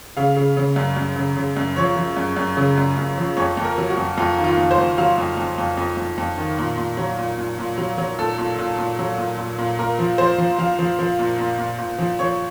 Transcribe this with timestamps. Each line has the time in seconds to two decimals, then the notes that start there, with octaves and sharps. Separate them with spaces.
0.17 C#3 F5
0.36 C#3
0.57 C#3
0.76 F#2
0.97 F#2
1.16 C#3
1.37 C#3
1.57 F#2
1.76 F3 C#5
1.96 F3
2.17 F#2
2.37 F#2
2.57 C#3
2.78 F#2
2.98 F#2
3.17 F3
3.37 F2 C#5
3.57 F2
3.64 A#4
3.78 F#3
3.90 F#4
3.97 F2
4.17 F2 F4
4.38 D#3
4.44 F4
4.58 F2
4.71 C5
4.78 F2
4.98 F#3 F5
5.18 F2
5.37 F2
5.58 F2
5.77 F2
5.97 F2
6.18 F2
6.38 D#3
6.58 A#2
6.78 A#2
6.97 F#3
7.19 A#2
7.38 A#2
7.59 A#2
7.78 F#3
7.98 F#3
8.19 A#2 A4
8.38 A#2
8.58 A#2
8.78 A#2
8.99 F#3
9.18 A#2
9.38 A#2
9.58 A#2
9.79 A#2 A#4
9.99 F3
10.18 F3 C5
10.38 F3
10.58 F3 F5
10.79 F3
10.99 F3
11.19 A#2
11.38 A#2
11.58 A#2
11.78 A#2
11.98 F3
12.19 F3 C#5